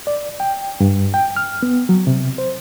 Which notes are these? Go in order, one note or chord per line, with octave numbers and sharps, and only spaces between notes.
D5
G5
G2
G5
F6
B3
F#3
C3
C5